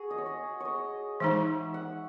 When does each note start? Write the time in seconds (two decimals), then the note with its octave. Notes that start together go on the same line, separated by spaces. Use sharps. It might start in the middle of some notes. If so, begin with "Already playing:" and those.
Already playing: F#4 G#4
0.11 D#5
0.18 C#5
0.26 D#5
0.60 C#5 D#5
1.20 E3 G#3 D#4 E5
1.74 F#5